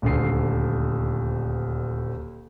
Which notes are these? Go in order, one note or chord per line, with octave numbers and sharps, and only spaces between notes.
D#1 D2 C7